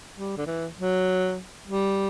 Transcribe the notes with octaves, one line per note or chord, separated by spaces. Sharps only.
G3
D3
E3
F#3
G3